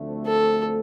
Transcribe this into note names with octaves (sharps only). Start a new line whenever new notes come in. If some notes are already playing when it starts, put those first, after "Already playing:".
Already playing: D2 D3 F3 A3 C4
A4